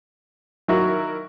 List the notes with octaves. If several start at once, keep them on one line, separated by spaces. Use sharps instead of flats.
D#3 F#3 E4 F#4 A#4